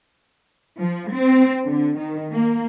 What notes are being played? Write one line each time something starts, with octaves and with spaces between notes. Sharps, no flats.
F3
C4
D3
D#3
A#3